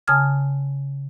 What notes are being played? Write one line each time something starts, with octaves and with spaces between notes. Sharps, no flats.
C#3 G#5 A5 D#6 F6 G#6